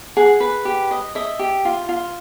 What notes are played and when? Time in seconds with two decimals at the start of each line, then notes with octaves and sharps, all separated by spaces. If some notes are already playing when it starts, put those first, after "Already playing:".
0.17 G#4 F#5
0.40 B4
0.65 G4
0.91 D#5
1.15 D#5 E5
1.39 G4
1.65 F4
1.89 F4